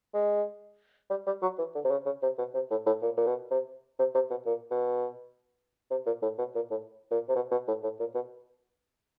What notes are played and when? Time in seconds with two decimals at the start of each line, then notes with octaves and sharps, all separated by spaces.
0.14 G#3
1.10 G3
1.27 G3
1.42 F#3
1.58 E3
1.75 D3
1.84 C3
1.91 C#3
2.06 C#3
2.22 C3
2.38 B2
2.54 C3
2.70 A2
2.87 A2
3.02 A#2
3.17 A#2
3.26 B2
3.51 C3
3.99 C3
4.14 C3
4.30 B2
4.46 A#2
4.71 B2
5.91 C3
6.06 A#2
6.22 A2
6.38 B2
6.55 A#2
6.71 A2
7.11 A#2
7.29 C3
7.35 B2
7.51 B2
7.68 A2
7.83 A2
7.99 A#2
8.14 B2